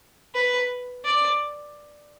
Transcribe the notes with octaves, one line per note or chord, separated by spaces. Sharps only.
B4
D5